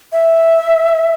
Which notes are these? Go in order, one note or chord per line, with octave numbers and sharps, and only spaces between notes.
E5